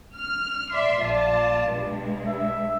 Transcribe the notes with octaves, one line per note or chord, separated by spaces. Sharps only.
F6
D5 E5 C6
A#1 F4 D5 A5
B1 G2 G#3
E5